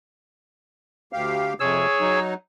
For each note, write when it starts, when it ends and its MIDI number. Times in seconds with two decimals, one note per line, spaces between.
1.13 1.53 38
1.13 1.53 67
1.13 1.53 77
1.60 1.86 41
1.60 1.86 48
1.60 2.19 68
1.60 2.19 73
1.60 2.19 88
2.00 2.34 54
2.00 2.34 63